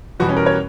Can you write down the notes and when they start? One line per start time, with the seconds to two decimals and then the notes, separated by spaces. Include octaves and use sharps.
0.20 E2 B2 G3 F#4
0.29 C#4
0.37 A#4
0.46 C#5